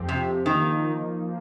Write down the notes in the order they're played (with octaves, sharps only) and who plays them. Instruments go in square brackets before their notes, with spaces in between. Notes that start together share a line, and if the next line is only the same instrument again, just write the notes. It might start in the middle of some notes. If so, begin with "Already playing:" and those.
Already playing: [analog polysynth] F2 F3 C4 G4
[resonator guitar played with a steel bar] C3
[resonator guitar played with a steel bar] D#3 [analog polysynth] F3 A#3 D#4
[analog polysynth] F3 A#3 F4